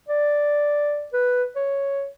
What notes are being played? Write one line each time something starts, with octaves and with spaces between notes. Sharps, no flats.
D5
B4
C#5